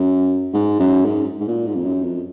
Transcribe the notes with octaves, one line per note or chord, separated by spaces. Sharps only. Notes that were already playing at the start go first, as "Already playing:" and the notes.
Already playing: F#2
G#2
F#2
G#2
G#2
A#2
G#2
F2
F#2
F2